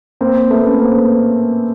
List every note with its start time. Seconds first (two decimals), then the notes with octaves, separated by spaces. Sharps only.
0.21 A#3 C4
0.50 A3 B3
0.65 B3 C#4
0.79 A#3 C4